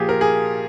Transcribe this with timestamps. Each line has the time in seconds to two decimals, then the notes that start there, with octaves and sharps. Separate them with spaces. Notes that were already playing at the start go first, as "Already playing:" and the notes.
Already playing: A#2 F3 G4 G#4
0.09 A#4
0.21 G#4